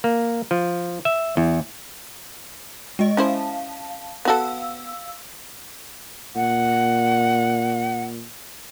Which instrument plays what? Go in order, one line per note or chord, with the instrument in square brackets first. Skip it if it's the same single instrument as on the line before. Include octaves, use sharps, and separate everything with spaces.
[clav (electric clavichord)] A#3
F3
E5
E2
[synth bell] G#3 D#5
[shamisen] C#4 E4 C5 [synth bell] F5 A5
[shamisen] B3 F#4 A4 [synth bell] F5 E6
[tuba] A#2 [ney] F#5